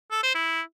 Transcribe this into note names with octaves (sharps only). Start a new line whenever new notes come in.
A4
C5
E4